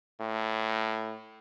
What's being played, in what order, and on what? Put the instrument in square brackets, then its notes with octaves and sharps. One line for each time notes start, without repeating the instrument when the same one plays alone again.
[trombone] A2